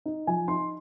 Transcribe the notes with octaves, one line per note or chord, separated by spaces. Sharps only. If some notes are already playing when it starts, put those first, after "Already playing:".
D#4
F3 G#5
D#4 C6